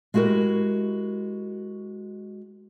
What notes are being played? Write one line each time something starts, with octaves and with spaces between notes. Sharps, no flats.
G#3 E4 F#4 G4 A#4